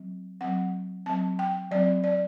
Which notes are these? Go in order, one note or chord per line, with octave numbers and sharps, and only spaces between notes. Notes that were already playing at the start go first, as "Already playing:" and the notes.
Already playing: F#3 C4
F#3 C4 F#5
F#3 C4 A5
G5
F#3 C4 D5
D5